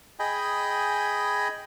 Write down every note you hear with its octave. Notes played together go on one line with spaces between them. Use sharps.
G#4 D#5 G5 G#5 B5